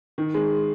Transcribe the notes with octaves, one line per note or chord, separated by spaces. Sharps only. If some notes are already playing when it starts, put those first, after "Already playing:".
D#3
G#3